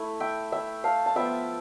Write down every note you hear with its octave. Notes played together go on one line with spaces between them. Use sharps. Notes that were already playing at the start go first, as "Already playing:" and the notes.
Already playing: A3 E4
E5 G5
A3 E4 E5 G5
F5 A5
A5
F3 B3 F4 E5 G5